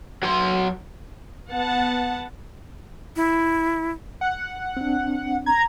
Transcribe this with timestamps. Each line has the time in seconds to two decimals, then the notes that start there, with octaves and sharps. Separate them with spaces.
0.23 F#3 C6
1.50 B3 F#5 A5
3.16 E4
4.21 F#5
4.77 C4 D4
5.46 A#5 G#6